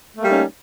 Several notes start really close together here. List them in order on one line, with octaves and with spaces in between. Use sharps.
A3 A#3 G3 D#4 C#4